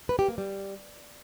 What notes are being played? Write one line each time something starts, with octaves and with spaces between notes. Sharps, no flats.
B4
G4
A#3
G3